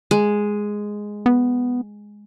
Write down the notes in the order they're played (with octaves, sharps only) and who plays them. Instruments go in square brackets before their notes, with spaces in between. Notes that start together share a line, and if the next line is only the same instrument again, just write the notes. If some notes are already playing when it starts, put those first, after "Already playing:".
[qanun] G#3
[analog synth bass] B3